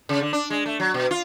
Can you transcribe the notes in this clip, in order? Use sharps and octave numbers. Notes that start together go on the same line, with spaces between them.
C#3
D3
D4
G#3
A3
F#3
B2
F4